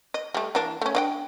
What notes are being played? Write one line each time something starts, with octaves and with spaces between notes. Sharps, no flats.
D#5
G3 A3
E3 A#3 D4
A3 C#4
D4 D5 G5